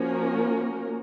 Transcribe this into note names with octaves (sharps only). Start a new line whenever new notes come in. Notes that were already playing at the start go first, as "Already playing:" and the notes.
Already playing: F3 A#3 C#4 F#4 A#4